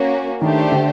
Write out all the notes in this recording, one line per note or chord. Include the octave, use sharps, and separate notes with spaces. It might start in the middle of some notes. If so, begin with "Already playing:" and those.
Already playing: A#3 C#4 F#4
D#3 A3 D4 G4 C5
D3